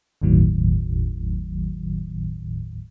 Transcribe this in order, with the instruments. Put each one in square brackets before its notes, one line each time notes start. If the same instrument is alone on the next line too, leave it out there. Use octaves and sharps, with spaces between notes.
[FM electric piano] G1 D#2 A2 D#3 F#3